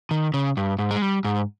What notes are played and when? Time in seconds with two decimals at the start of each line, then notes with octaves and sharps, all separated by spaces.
0.11 D#3
0.34 C#3
0.57 G2
0.79 G#2
0.91 G#3
1.02 G3
1.25 G#2